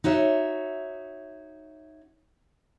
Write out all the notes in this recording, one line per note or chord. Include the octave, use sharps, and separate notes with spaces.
D#4 F#4 C#5 E5